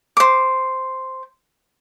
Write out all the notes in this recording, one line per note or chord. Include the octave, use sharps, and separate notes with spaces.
C5 D6